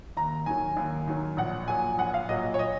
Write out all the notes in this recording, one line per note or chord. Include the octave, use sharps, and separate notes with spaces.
D#2 A#5
D#3 F#3 G#5
D#2
D#3 F#3
A#1 F#5
A#2 F#3 G#5
A#1 F#5
F5
A#2 F#3 D#5
C#5
D#5